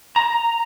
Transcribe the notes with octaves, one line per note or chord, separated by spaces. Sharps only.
A#5